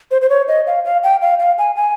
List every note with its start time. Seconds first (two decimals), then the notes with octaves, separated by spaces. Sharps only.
0.11 C5
0.22 C5
0.30 C#5
0.48 D#5
0.67 F5
0.85 F5
1.03 G5
1.22 F5
1.39 F5
1.58 G#5
1.76 G#5